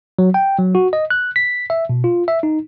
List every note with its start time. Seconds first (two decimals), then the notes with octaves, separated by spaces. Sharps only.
0.19 F#3
0.34 G5
0.58 F#3
0.75 F#4
0.93 D#5
1.10 F#6
1.36 B6
1.70 E5
1.89 B2
2.04 F4
2.28 E5
2.43 D#4